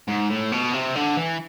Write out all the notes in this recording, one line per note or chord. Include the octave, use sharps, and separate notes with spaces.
G#2
A2
B2
C3
D3
E3